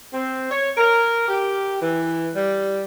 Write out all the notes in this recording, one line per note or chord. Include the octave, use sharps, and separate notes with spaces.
C4
C#5
A#4
G4
E3
G3